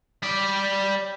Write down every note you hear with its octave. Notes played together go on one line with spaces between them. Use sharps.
G3 D5